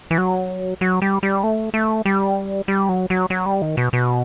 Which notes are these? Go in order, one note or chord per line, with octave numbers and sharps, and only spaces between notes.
E3
F#3
F#3
G3
G3
A3
A3
G3
G3
F#3
F#3
F#3
G3
D#3
B2
B2